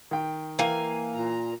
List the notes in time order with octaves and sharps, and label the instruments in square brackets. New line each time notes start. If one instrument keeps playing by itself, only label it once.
[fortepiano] D#3 G5
[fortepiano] E3 F5 G5 [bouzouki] A#3 G#5
[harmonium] A#2 A#5